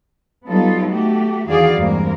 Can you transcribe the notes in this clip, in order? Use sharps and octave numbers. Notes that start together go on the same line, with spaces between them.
F#3 G3 B3 D#4 F4 A4
A3 F#4 G4
E2 D#3 F#4 G#4 D5 F5
E2 G2 G#3 A#3 C4 A#4